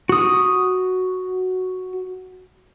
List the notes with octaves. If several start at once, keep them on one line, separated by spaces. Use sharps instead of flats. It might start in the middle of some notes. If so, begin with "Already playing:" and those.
F#4 D#6